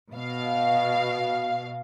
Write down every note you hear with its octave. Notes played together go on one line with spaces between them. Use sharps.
B2 F5